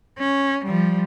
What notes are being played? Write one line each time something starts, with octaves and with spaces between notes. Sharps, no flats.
C#4
F3 G3